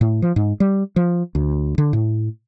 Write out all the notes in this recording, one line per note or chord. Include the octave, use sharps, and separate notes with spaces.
A2
F3
G#2
G3
F3
D2
D3
A2